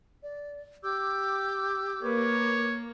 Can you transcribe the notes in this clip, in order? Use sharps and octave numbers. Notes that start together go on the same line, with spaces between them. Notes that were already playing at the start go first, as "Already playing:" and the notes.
D5
G4 D6 E6 G6
A#3 B4 C#5 D6